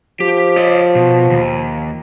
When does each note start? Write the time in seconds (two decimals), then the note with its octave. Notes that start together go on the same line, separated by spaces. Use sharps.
0.20 F3 G4
0.56 C#5 D#5
0.95 B2
1.30 D#2